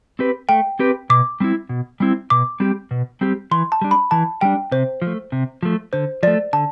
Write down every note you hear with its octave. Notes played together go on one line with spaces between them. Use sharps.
C4 G4 B4
A3 G5
C4 G4 B4
B2 D6
G3 C4 E4
B2
G3 C4 E4
B2 D6
G3 C4 G4
B2
G3 C4 G4
E3 C6
A5
G3 D4
B5
E3 A5
G3 D4 G5
C3 C5
F3
A3
C3
F3 A3
D3 C5
F3 A3 D5
D3 A5